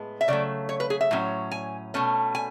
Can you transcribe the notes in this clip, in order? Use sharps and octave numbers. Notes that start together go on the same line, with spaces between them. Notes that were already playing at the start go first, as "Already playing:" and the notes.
Already playing: A2 G#3 B3
E5
C#3 F#3 A3 D5
C#5
B4
G#4
E5
A2 F#3 C#4
G#5
B2 A3 C#4
G#5